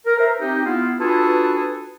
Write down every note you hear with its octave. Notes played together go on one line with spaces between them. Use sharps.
A#4
B4 C5 E5 A#5
C4 D#4 G4
B3 E4 F4
D4 F4 F#4 G#4 A4 B4